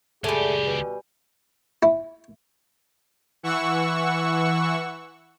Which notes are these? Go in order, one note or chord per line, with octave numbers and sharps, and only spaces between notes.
C#2 G3 A3 G4 G#4 G#5
B2
E4
E3 F#5 C#6 E6